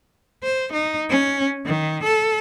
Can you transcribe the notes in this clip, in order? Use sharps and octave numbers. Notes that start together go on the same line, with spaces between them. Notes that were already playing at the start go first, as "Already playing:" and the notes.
C5
D#4
C#4
D#3
A4